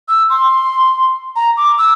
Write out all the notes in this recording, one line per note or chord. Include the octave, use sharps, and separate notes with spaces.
E6
C6
A#5
D6
E6